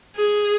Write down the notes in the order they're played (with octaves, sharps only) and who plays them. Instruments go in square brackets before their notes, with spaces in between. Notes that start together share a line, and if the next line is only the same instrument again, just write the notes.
[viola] G#4